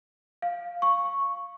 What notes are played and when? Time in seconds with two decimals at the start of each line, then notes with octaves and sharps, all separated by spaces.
0.42 F5
0.82 C#6